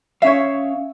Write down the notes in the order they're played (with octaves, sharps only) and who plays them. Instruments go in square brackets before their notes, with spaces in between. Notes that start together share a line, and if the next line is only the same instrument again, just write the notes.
[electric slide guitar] C#4 F5 [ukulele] C#5 E5